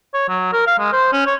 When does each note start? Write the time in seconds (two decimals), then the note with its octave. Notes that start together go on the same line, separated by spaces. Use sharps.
0.14 C#5
0.29 F#3
0.53 A#4
0.67 F5
0.79 G#3
0.93 C5
1.12 C#4
1.26 C#5